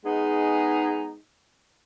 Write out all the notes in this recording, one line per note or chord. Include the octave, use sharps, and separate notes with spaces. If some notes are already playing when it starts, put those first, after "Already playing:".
G#3 B3 D#4 G#4